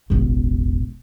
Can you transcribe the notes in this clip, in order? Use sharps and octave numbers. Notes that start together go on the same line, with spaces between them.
E1 A1